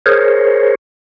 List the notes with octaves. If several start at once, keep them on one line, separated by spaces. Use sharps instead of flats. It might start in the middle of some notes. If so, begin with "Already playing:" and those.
G#4 A#4 C5 C#5